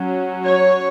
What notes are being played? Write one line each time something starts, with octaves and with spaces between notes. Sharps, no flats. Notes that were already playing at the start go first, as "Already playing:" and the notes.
Already playing: F#3 C#4
C#5